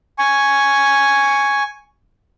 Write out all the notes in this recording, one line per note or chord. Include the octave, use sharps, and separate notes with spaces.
G#5 C#6